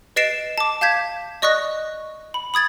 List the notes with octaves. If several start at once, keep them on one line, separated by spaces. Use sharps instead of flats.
B4 D#5 A6 C7 D7 E7
A5 D6
F5 A5 G6 G#6 B6
D5 D#5 C#6 D#6 F#6 A#6
B5
B5 D#6 G#6 A6